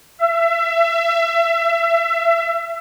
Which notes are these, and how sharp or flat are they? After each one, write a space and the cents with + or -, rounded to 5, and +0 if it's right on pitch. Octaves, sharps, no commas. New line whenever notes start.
E5 +30